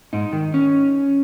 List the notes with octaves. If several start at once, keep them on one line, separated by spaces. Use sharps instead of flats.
G#2 D#4
D#3
C#4